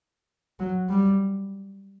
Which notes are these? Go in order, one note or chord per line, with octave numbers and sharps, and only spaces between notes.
F#3
G3